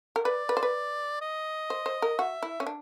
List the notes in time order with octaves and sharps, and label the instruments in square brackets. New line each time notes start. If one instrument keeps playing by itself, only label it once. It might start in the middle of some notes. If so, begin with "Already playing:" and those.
[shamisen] A#4
[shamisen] B4 [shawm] D5
[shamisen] B4
C5
B4
[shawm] D#5
[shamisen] C5
C5
A#4
[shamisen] F#4 [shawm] E5
[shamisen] E4
C#4
D4